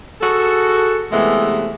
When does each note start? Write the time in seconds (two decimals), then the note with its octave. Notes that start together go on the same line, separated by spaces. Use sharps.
0.21 F#4 G#4 A4
1.12 C3 E3 G#3 A3 B3